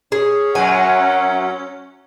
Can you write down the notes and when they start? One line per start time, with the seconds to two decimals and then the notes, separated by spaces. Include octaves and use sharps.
0.12 C#4 G#4
0.55 F#2 F#3 F#5 G#5